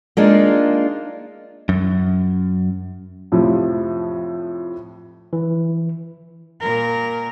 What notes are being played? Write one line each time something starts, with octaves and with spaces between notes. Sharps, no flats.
G#3 A#3 D4 D#4 F4
F#2
F2 A2 C3 F3
E3
A#2 A#4